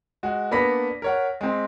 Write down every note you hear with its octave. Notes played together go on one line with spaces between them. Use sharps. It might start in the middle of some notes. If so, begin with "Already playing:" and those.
G#3 F#4
A#3 B3 D4 B5 A#6 B6
A#4 C#5 F#5
G#3 C4